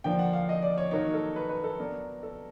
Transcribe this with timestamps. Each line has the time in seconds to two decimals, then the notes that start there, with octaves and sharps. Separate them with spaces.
0.04 D3 F3 A#3 D4 G5
0.19 F#5
0.33 F5
0.49 D#5
0.62 D5
0.78 C#5
0.91 D#3 F#3 A#3 D#4 C#5
1.14 A4
1.36 B4
1.49 B4
1.64 A4
1.79 F#3 B3 D4 A#4
2.23 A4